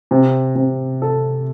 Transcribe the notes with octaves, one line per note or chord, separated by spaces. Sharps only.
C3
C3
A4